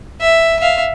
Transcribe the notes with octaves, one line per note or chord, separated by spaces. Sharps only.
E5
E5 F5